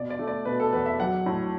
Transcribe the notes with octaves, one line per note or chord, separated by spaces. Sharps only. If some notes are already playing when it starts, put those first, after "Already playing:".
Already playing: B2 D5
D5
A3
D5
B2 B4
A4
E2 B4
E5
F#3 F#5
A2